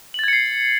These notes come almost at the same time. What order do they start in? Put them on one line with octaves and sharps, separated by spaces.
F#7 A6 G#6 C#7 C7